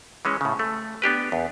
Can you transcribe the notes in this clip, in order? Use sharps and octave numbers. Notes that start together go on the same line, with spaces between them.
E3 G#3 C#4
A2 C#3
A3
B3 D4 G4 B4
E2